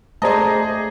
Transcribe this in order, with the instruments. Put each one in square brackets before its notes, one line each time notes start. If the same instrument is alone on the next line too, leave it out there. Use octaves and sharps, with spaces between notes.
[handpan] A3 C5 D5 [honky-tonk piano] G#4 D#5 [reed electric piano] A5 A#5